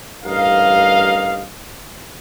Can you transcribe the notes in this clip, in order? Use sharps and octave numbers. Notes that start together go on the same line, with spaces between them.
A1 G2 A#4 D#5 F5